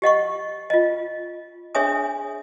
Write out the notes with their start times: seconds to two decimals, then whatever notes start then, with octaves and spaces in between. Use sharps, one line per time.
0.02 G4 D#5 F#5 C#6
0.70 F4 D#5
1.75 D4 G#4 C#5 E5 G#5 D#6